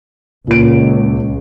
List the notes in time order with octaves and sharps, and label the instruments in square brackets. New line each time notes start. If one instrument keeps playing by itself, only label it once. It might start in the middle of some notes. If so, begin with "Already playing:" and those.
[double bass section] C#2 [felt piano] A#2 D7